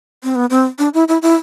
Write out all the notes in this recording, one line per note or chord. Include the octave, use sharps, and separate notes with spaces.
C4
B3
C4
D4
E4
E4
E4